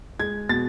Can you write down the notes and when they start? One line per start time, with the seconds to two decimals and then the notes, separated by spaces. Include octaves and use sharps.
0.20 G#3 G#6
0.49 B2 A6